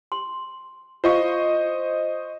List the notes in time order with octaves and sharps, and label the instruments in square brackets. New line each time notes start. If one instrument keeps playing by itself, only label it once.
[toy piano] C6
[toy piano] F4 F5 [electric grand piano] C5 D#5 C#6